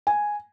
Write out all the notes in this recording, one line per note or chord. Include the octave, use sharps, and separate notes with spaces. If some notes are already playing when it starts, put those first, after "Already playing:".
G#5